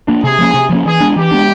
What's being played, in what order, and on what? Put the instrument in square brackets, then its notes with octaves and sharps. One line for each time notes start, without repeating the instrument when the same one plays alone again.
[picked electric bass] A#3 D4
[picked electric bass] C3 [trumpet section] G#4
[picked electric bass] F3 A#3 C#4
C3
F3 A#3 C#4
[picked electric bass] E3 [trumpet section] G#4
[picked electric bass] G#3 B3 D4
[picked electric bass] E3 [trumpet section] G4
[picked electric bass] G#3 B3 D4